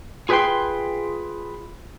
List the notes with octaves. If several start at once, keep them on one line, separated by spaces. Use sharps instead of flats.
F4 G#4 B4 D#5 G5 C6